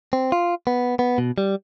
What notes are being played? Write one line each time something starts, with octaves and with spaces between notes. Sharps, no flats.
C4
F4
B3
B3
B2
G3